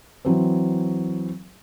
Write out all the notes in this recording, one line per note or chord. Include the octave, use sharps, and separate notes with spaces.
E3 F#3 C4